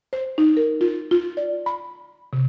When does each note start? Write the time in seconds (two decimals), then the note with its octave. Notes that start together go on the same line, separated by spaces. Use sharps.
0.13 C5
0.38 D#4
0.57 A#4
0.81 F4
1.11 F4
1.37 D5
1.66 B5
2.33 C3